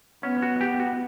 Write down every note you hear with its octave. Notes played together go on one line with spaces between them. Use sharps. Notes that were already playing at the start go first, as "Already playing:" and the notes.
B3 C#4
F#4
G4
F#4